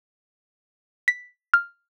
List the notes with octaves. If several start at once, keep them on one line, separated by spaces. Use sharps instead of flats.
B6
F6